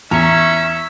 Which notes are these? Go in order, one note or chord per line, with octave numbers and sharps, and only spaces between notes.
E2 C#4 E5 A#5 C#6